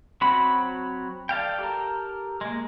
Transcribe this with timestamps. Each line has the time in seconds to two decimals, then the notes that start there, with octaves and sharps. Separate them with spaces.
0.21 F#3 C4 F#4 B5
1.29 A4 D5 F5 G5
1.59 G4 A4 A#4
2.41 G#3 A#3